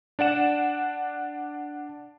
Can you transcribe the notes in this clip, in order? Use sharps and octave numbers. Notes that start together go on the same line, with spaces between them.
D4 D5 F#5 E7